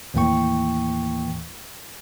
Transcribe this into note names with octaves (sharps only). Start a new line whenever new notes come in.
D#2 A2 E3 A#3 G5 C#6